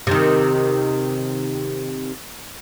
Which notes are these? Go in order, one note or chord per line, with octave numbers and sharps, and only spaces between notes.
C3 D#3